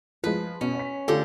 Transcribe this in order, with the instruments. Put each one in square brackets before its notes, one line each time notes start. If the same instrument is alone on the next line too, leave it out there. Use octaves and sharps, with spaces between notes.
[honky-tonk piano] F3 G#3 [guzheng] B4
[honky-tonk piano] B2 [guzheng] C#4
[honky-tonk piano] C#5 B6
[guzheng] D3 G4 [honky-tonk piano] A3 F4 A4